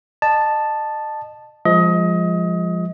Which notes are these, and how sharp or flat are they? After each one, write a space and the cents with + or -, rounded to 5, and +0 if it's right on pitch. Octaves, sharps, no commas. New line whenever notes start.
D#5 -30 A5 +0
F3 +0 G#3 -20 D#5 +25